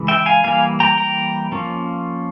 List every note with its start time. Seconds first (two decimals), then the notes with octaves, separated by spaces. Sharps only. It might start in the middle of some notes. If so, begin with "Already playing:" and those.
Already playing: C#3 E3 G#3
0.08 E5 G5
0.26 F5 G#5
0.44 E3 G3 A#3 F5 G#5
0.80 G5 A#5
0.97 G5 A#5
1.52 F3 A#3 C#4